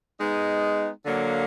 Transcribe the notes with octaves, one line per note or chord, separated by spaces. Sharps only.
G#3 B3 D#4
D3 F#3 A#3